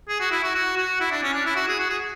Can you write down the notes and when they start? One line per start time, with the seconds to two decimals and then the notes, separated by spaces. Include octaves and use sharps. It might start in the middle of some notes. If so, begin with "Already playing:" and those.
0.09 G#4
0.20 F#4
0.31 E4
0.43 F#4
0.55 F#4
0.77 F#4
1.00 E4
1.11 D4
1.23 C#4
1.33 D4
1.46 E4
1.56 F#4
1.68 G#4
1.79 F#4
1.90 G#4